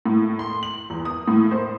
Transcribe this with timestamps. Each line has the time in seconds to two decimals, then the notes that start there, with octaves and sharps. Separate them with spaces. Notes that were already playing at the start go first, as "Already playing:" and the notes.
0.06 A2
0.39 C6
0.63 F#7
0.90 E2
1.05 D#6
1.28 A2
1.51 C5